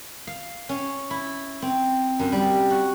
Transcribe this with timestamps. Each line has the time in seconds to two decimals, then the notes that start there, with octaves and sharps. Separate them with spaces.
0.27 F5
0.69 C#4
1.10 E4
1.62 C4
2.19 F#2
2.32 G3
2.70 F#4